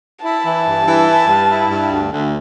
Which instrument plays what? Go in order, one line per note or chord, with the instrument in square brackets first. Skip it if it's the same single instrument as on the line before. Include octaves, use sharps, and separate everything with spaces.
[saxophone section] E4 [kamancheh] A5
[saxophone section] E3
G2
E3
E4
G2
E4
G2
D2
D2